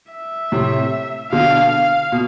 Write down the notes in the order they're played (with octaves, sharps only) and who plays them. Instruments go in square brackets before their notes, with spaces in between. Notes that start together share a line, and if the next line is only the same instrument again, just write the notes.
[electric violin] E5
[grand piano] A2 C3
[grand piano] B2 D3 [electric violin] F5
[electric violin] F5
[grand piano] B2